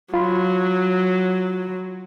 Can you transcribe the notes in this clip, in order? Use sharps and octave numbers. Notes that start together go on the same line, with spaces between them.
F#3 F4 B5 C6